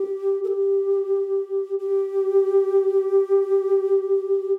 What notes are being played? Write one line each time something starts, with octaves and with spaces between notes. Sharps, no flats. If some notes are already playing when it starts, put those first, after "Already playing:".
Already playing: G4
A4
G4
G4